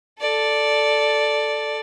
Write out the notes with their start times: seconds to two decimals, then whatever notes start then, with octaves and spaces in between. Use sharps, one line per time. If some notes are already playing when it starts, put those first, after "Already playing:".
0.20 A4 D5